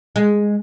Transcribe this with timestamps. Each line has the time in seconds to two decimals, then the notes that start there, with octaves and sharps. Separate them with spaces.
0.16 G#3